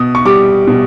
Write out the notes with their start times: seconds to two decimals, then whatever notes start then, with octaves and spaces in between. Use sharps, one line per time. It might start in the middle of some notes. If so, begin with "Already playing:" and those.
Already playing: B2 D#6
0.15 C#6
0.25 G3 D6
0.67 B2